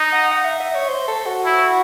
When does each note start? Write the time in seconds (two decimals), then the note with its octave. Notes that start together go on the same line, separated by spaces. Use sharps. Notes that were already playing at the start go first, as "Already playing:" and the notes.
Already playing: D#4
0.12 F#5
0.31 F#5
0.45 E5
0.60 E5
0.74 C#5
0.89 C5
1.08 A4
1.26 F#4
1.45 E4